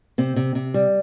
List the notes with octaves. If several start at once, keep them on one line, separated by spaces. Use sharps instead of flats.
C3 C4
C3
C3
G3